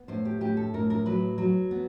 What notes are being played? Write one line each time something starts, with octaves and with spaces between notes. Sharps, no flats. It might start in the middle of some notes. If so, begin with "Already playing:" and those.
Already playing: B3
A2 C5
G4
A2 G4
A4
A2 A#4
A#4
F#3 B4
F#3
B3